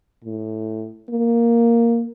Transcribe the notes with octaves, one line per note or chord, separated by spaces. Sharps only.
A2
A#3